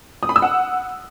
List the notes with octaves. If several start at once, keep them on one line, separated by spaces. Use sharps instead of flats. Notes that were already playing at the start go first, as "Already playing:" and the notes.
D#6
B5
E6
F#5